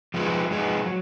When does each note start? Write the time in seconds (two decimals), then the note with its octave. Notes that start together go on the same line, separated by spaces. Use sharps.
0.14 F3 G#3 D#4 G#4 B4
0.51 F3 G#3 D#4 G#4 B4
0.86 F#3